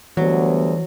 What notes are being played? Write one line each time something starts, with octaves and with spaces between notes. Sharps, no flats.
D2 E3 F#3 G3 B3